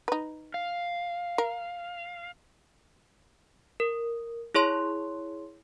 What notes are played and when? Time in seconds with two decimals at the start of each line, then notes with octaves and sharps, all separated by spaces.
0.08 D#4 B4
0.54 F5
1.38 A#4
3.80 A#4
4.55 E4 G#4 C#5 C6